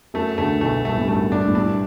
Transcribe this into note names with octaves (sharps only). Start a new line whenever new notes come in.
F#2 F#3 A3
D2 D3 A3
B1 B2 A3
G2 A3
A2
G2
F#2 A3
G2 D4
A2
G2 D4